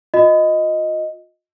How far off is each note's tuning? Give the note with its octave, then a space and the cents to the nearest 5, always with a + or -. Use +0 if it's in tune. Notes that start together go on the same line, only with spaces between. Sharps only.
F4 +35 D#5 +5